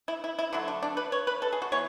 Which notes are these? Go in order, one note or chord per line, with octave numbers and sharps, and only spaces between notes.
E4
E4
E4
D3 F#3 A3 E4
D4
D4
B4
C#5
B4
A4
G#4
F#4
E3 B3 C#5